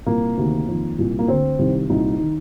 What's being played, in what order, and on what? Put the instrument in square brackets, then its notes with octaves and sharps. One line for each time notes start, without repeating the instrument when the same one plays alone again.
[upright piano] C2 A#2 A#3
D2 C3 D#3
F2 D#3
C2 A#2
A#3
D2 D3 C4
C2 C3 D#3
C2 A#2 D#4
D#3